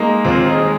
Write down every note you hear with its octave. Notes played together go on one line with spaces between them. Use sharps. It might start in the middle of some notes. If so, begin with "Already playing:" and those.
Already playing: G#3 A#3 D#4
D#2 C4 F4
D#4 G#4
G#3